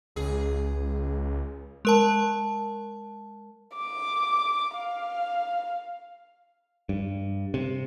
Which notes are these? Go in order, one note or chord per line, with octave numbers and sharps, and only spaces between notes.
C#2 G#4
G#3 A#4 A5
D6
F5
G2
C3